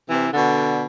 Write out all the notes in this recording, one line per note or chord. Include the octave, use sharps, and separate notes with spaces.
C3 E3
B2 D3